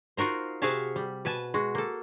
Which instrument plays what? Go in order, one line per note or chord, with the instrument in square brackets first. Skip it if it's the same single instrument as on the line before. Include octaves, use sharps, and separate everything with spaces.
[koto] D#4 F4 F#4 A#4 C5
C3 F#4 G#4 E5 F5 A5
G3
B2 B4 G#5 A5
G#3 F#4
A#3 A4